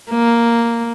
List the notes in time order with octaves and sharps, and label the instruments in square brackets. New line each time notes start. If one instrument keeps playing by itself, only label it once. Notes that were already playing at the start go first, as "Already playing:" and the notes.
[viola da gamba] A#3